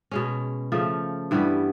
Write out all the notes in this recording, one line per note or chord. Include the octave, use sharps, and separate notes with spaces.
B2 G#3 C#4
C#3 F3 A3
G2 E3 G3 B3